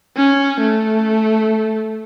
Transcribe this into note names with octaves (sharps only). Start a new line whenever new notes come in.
C#4
A3